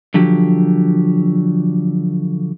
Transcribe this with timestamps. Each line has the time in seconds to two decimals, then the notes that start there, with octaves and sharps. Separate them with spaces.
0.14 D3 F3 F#3 G4